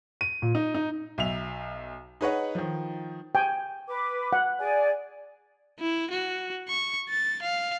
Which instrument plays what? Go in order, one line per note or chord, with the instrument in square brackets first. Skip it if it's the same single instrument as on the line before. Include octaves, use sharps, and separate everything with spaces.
[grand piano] D#7
A#2
D#4
D#4
[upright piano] B1 E5 F7
D#4 G#4 B4 C#5 D#5 F#5
D#3 F3
[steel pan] G5 G#5
[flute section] B4 D6
[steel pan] F#5
[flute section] G#4 D5 G#5
[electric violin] E4
F#4
C#6
A6
F5